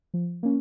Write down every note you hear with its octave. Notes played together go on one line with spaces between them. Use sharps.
F3
A#3 C#4